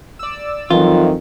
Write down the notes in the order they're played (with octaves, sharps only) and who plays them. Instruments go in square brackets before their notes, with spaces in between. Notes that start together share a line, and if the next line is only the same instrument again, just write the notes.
[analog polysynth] D5 E6
[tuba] F2 [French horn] D#3 [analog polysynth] E3 F#3 [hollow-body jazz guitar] F4